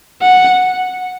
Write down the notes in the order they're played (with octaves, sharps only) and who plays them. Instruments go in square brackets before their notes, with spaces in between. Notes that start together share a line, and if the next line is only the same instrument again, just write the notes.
[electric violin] F#5